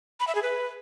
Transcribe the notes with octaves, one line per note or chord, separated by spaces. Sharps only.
B5
E5
G#4
B4